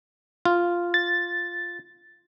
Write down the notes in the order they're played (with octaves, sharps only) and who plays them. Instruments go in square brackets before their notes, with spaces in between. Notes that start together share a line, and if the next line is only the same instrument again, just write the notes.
[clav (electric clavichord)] F4
[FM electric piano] A6